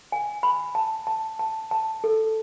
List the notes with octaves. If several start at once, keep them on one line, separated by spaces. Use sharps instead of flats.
G#5
B5
A5
A5
A5
A5
A4